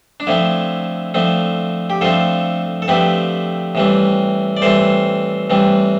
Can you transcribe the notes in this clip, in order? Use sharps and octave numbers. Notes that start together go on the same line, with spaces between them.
D4
D3 F3 A3 C4 E4
D3 F3 A3 C4
G4
D3 F3 A3 C4 F4 A4
A4
D3 F3 A3 C4 G4 B4
A2 E3 G3 C4
D5
A2 E3 G3 C4 A4 C5
A2 E3 G3 C4